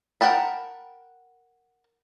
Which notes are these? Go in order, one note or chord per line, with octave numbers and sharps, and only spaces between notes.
A#4 F#5 G5 A5 B5